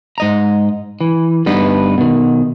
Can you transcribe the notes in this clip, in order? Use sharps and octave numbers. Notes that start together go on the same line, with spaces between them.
G#2 D#5 A#5
E3
D2 G2 B3 D#4
B2 D#3